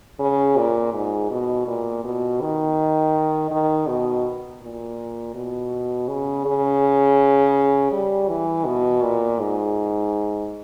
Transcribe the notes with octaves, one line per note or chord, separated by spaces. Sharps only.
C#3
A#2
G#2
B2
A#2
B2
D#3
D#3
B2
A#2
B2
C#3
C#3
G3
E3
B2
A#2
G#2